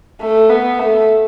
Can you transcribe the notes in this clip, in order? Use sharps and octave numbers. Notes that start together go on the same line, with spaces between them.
A3
B3
A3